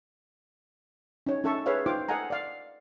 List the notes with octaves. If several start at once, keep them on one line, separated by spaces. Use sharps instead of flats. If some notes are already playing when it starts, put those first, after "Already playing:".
C#4 D#4 C#5
C#4 D#4 A4 E5 A5 C#6
G#4 B4 C#5 E5 F5
D#4 F4 C5 F5 G5 D6
A4 D#5 F5 F#5 G#5 A#5
D5 F5